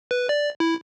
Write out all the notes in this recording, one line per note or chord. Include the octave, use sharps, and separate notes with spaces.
B4
D5
E4